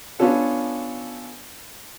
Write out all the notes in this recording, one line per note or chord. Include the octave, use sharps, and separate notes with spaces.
B3 C#4 D4 F4 A4 C#5